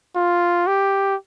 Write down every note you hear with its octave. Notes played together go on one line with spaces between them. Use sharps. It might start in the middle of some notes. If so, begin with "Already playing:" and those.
F4
G4